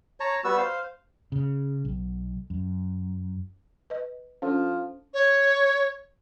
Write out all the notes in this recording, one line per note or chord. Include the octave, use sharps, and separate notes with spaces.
C#5 A5 A#5
G3 B3 F#4 E6
C5 F5
C#3
B1
F#2
B4 D#5
F3 C#4 D4 A4
C#5